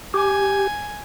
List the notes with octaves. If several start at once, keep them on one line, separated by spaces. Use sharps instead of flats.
G4 G#5